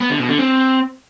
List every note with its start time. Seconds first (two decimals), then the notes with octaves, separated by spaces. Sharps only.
0.01 B3
0.10 D3
0.19 B2
0.29 D3
0.38 C4